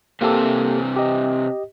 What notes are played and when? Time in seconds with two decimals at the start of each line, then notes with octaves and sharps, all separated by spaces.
0.21 C3 E3 A#3 G4 A4 C5
0.96 G4 D#5